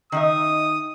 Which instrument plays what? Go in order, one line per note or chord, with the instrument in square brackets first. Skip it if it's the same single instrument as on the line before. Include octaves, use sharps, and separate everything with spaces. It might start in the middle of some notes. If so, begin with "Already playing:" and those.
[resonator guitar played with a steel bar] D#3 D#4 E5 [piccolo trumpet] D#6